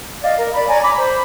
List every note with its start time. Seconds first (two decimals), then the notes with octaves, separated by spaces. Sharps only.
0.23 D5 D#5 F5
0.37 A#4
0.54 D5 B5
0.68 C#5 D5 G#5 A#5
0.82 A#5 B5 D6
0.98 C5 B5